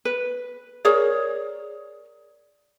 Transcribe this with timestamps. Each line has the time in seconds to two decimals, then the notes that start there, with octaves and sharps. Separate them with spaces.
0.05 B4
0.85 G#4 A#4 C#5 D5